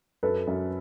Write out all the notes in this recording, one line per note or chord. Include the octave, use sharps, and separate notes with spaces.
F#2 A4 B4
F#2